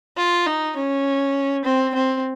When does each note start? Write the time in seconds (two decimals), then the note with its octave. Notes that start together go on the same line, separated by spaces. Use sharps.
0.17 F4
0.46 D#4
0.76 C#4
1.65 C4
1.95 C4